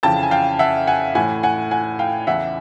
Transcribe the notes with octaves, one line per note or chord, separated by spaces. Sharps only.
F2 C#3 E3 G5 A5
G#5
F5 G5
E5 F#5
F#5 G#5
A2 E3 F#5 G#5
F#5 G#5
F#5 G#5
F5 G5
E2 C#3 E3 E5 F#5